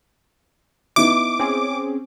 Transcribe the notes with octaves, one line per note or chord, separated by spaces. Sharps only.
B3 D#4 E4 D6
C4 C#4 G#4